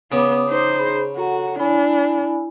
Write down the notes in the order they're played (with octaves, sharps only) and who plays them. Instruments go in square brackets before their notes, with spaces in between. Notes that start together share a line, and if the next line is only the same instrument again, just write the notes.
[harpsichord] C#3 [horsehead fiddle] B3 [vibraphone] D6 D#6
[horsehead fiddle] D#4 C5
[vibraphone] G#4 B5
[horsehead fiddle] F#4 [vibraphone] A4 F#5 A#5
[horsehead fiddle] D4 [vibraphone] E4 G#5 B5